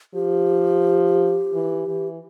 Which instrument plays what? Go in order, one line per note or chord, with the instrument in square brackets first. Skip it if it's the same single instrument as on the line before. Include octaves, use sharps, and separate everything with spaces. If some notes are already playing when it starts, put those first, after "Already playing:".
[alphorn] F3 [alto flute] G4
[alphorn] E3
E3